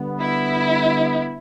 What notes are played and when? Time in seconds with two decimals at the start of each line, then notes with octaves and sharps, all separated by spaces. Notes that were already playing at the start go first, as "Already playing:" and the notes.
Already playing: D3 G3 B3
0.20 E4